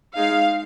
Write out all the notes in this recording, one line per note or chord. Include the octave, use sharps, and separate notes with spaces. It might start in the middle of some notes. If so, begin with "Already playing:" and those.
G#3 D#4 F5